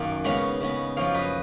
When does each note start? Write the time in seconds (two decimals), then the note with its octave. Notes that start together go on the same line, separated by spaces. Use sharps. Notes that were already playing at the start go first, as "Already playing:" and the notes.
Already playing: F#2 D#3 A#3
0.24 C#3 G#3 B3 C#5 F5
0.61 C#3 G#3 B3
0.96 F#2 F3 A#3 C#5 F5
1.15 B4 D#5